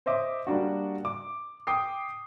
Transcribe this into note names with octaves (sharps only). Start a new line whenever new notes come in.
C5 C#5 D#5 E5 D6
G3 A#3 D4 F#4
D6
G5 D6 D#6 C7